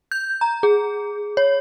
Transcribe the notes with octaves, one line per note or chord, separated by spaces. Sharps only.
G6
A#5
G#4
C#5